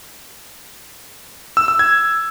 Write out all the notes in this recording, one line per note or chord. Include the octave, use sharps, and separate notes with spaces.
E6
E6
G#6